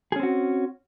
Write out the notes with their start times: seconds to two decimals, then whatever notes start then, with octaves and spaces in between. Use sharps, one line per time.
0.12 G#4
0.16 C#4
0.20 C4
0.23 F#4